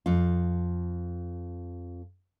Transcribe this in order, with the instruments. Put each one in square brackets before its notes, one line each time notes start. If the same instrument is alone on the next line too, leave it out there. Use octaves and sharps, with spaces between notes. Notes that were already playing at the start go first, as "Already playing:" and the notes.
[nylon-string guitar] F2 F4